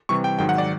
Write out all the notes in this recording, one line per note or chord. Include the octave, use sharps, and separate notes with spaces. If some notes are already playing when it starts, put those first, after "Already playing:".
C3 E3 G3 C#6
G5
G#2 D#3 F#3 G5
F#5
D5